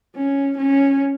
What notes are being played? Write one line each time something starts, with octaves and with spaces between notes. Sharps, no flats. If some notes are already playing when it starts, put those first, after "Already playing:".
C#4
C#4